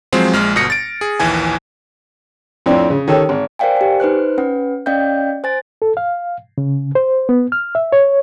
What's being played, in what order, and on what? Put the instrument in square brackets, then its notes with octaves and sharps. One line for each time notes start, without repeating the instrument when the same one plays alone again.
[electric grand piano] F3 F#3 G#3 C4 C5
A#1 G#3 F6
G1 B2 D#6 A#6 C#7
A6 D7
G#4
A#1 D#2 E3 G#5
[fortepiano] F2 A2 C4 D4
C#3
D#3 C#4 G4 A4 C#5
G#1
[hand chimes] A#4 C5 D5 F5 G5 G#5
G4 G#5
D#4 B4 C5 F#6
C#4 B4 F#5
C#4 D5 D#5 F5 G5 G6
C5 G#5 A6
[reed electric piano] A4
F5
C#3
C5
B3
F6
E5
C#5